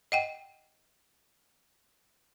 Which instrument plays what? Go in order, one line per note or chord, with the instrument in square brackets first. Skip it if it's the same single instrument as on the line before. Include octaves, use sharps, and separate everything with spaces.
[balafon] D#5 F#5 G5